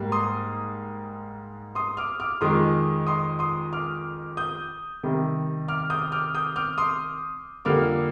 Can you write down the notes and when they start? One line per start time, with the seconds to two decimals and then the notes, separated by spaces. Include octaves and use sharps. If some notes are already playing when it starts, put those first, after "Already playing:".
Already playing: G#2 G3 A#3
0.12 C6 D#6
1.75 C6 D#6
1.97 D6 F6
2.20 D6 F6
2.41 F2 D#3 G#3 C6 D#6
3.07 C6 D#6
3.39 C6 D#6
3.73 D6 F6
4.37 D#6 G6
5.03 C3 D#3 G3
5.68 D6 F6
5.90 D#6 G6
6.12 D6 F6
6.35 D#6 G6
6.56 D6 F6
6.78 C6 D#6
7.65 F2 D3 G3 A#3 D6 F6